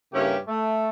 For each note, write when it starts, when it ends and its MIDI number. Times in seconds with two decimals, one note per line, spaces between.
0.13 0.35 43
0.13 0.35 49
0.13 0.35 58
0.13 0.35 61
0.13 0.35 64
0.13 0.35 67
0.47 0.89 57